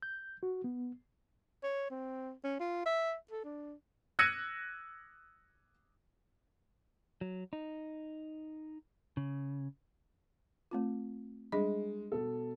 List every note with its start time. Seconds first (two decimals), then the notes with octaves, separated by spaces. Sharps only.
0.02 G6
0.43 F#4
0.64 B3
1.63 C#5
1.90 C4
2.44 C#4
2.60 F4
2.86 E5
3.31 A4
3.44 D4
4.19 E6 F#6 G#6 A#6 C#7 D#7
7.21 F#3
7.53 D#4
9.17 C#3
10.71 A3 C4 F4
11.52 G3 G#3 D4 D#5
12.12 B2 A4